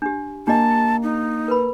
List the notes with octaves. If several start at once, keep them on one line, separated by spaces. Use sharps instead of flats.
D4 G4
A#3 D4 G4 D#5 A5
D#4
A#4 B4 B5